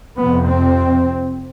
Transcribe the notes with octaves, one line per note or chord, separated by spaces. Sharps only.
F2 C3 B3
C4